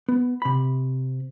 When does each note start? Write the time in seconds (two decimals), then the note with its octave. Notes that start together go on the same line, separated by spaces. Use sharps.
0.08 B3
0.42 C3 B5